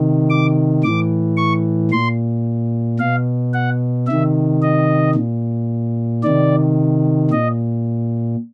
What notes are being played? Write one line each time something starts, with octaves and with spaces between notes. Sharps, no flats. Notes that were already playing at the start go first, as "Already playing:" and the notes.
Already playing: C3 D#3
D6
A2 E3 D6
C#6
A#2 C6
B2 F5
F#5
C3 D#3 E5
D#5
A#2
C3 D#3 D5
A#2 D#5